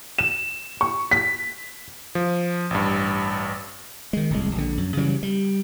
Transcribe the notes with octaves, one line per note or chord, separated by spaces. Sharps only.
E7
C#6
B6
F3
A1 G2
D#3 G#3
D1 C2 G#3
A#1 D3
F#2
C#3 E3 F#3 G3
G3